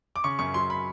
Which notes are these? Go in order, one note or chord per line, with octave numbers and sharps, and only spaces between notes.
D6
C#3 C#6
F#2 C#6
F#3 C6
B5